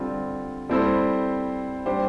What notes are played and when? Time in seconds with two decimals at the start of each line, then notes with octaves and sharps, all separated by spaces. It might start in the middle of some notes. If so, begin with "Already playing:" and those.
Already playing: D3 G3 C4 F4
0.69 G3 C4 E4 A4 C5
1.86 G3 D4 G4 C5